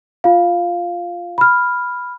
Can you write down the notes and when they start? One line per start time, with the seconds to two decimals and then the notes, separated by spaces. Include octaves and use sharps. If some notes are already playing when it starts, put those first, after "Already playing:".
0.24 F4 F5
1.38 B5 F6